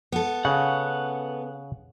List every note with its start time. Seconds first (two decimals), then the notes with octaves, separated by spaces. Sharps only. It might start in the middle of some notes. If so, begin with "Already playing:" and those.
0.12 B3 A4
0.45 C#3 F#5